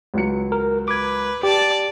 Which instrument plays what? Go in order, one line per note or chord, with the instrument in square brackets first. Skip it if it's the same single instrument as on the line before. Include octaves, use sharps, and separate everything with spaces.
[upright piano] C#2 F#3 C#7
[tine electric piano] A#4
[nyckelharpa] B4 [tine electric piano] D6 G#6
[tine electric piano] G4 [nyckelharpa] D5 A5